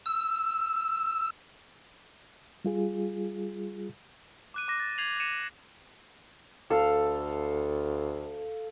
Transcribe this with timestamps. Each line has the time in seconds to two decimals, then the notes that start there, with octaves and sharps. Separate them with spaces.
0.06 E6
2.65 G3 F4 G#4
4.54 D6 F#6 D#7
4.68 D6 F#6 A#6
4.80 A6
4.98 G#6 C7 F7 F#7
5.20 C#7 D#7 E7
6.70 D2 A4 F5